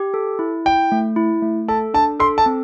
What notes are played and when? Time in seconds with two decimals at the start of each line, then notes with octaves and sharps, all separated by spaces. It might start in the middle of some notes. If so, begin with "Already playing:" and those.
Already playing: G4
0.14 A4
0.39 E4
0.65 E4 G5
0.92 A3
1.16 E4
1.42 A3
1.68 A4 A5
1.94 D4 A5
2.20 A4 C6
2.38 A5
2.46 C4